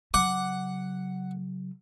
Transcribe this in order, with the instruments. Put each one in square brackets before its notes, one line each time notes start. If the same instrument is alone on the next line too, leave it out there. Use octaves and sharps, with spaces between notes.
[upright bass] C#3 F#3 [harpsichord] F#5 [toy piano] D6